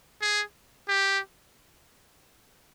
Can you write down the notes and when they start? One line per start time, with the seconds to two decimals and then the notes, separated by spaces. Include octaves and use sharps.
0.21 G#4
0.88 G4